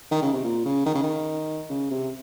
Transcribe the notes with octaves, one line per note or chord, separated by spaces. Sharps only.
D#3
C#3
C3
A#2
C#3
D#3
C#3
D#3
C#3
C3